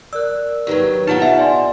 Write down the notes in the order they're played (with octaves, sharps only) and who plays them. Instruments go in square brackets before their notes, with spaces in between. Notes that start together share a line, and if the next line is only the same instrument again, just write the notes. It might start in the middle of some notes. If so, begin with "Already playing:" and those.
[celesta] A#4 D5 [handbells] E6 F#6
[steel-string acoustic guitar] D#3 E3 F#3 [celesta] G4 B4
[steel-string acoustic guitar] D2 B2 A5 [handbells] D#4 F4 F#5
[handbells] E5
[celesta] D5 G#5 C6